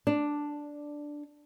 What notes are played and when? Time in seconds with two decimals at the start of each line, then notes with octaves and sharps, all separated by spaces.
0.07 D4